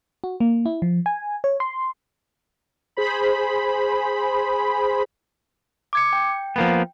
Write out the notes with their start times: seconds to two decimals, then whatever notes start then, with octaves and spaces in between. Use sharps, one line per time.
0.24 F#4
0.40 A#3
0.66 E4
0.82 F3
1.06 G#5
1.44 C#5
1.60 C6
2.97 G#4 C5 B5
5.93 D6 G#6 C#7
6.13 G5
6.56 F3 A#3 B3